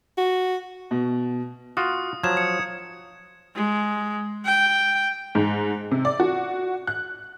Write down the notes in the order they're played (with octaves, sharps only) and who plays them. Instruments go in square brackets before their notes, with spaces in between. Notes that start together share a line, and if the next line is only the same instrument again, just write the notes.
[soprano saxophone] F#4
[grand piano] B2
[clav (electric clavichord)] F4 F#4 [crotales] D#6
[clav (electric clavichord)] F3 F#3 [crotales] G#6 E7
[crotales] C#7
[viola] G#3
G5
[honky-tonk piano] G#2
C3
D5
F#4
F#6